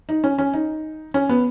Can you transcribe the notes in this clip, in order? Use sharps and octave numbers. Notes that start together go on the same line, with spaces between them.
D#4
C#4
C#4
D#4
C#4
B3